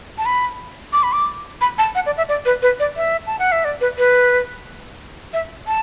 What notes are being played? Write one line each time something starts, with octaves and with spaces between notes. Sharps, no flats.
A5
B5
D6
B5
D6
B5
A5
F#5
D5
E5
D5
B4
B4
D5
E5
A5
F#5
E5
D5
B4
B4
E5
A5